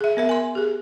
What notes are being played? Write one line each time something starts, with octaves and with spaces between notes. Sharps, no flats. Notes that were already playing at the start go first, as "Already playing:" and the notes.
G#4 E5
B3 A#4 E5
G#5 C6
G4 G#4